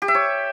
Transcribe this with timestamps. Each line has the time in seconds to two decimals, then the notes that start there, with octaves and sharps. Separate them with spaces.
0.02 G4
0.08 E5
0.15 C#5